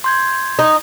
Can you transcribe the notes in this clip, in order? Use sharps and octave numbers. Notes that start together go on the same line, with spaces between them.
C6 G6 G#6
D#4